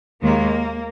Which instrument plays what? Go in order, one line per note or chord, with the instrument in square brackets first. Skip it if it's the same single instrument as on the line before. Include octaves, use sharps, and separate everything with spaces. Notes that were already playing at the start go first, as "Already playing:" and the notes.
[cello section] D#2 D#3 G#3 A#3